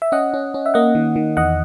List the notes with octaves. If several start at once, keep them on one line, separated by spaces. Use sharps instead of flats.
E5
C#4 D#5 F#5
C#4
C#4
E5
A#3 D#5 F#5
D#3
D#3
E2 D#5 F#5